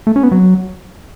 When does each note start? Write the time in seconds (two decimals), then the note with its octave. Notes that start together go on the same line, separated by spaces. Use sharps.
0.07 A3
0.16 C#4
0.23 B3
0.32 F#3